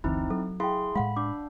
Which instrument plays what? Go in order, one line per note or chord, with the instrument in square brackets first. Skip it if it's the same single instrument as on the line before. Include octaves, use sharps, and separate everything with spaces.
[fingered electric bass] F#1 D2 E3 [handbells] C4 D#4 E4
[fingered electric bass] F#3 [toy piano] A4
[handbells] E4 G#4 C6 [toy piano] F5 G5
[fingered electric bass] A2 G#3 [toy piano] F5 F#5 [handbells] B5
[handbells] D4 [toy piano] D6